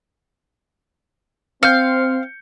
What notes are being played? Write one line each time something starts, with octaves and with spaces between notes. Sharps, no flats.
C4 F5 G6 C#7